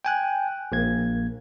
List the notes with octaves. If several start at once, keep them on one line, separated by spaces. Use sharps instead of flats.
G5 G#5 F#6
A#1 A#3 G#6